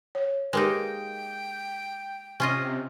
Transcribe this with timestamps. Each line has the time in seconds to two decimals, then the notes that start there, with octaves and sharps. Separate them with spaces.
0.15 C#5
0.53 G#3 A#3 D#4 G4 A#4 B4 G5
2.40 C3 C#4 F4 D#5